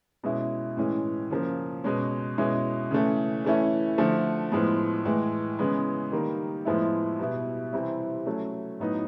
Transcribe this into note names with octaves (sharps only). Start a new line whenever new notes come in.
B2 G#3 C#4 E4
A2 E3 G#3 C#4
C#3 F3 A#3
B2 G#3 C#4
B2 G#3 C#4 E4
C#3 E3 A3
E3 A3 C#4 E4
D3 F3 A3
A2 F3 G#3 B3
A2 E3 G#3
C#3 E3 G#3 B3
D#3 G3 A#3
A2 F3 G#3 B3 E4
B2 G3 B3 E4
C3 E3 G3 C4 E4
F#3 A3 C#4
A2 F#3 B3 D#4